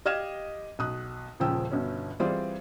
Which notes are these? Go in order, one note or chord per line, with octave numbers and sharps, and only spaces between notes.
G4 D#5 F5 F6 G#6 E7
B1 D#6 F#6
D#1 C#3 F3 G5 E6
G1 B2 C#4
E3 G3 C4 F4 G#4 D5